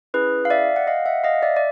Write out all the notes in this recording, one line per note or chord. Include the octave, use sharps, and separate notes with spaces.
C#4 E4 G#4 B4
F5
D5 E5
F#5
D#5 F5
E5 F#5
D#5 F5
D5 E5
D5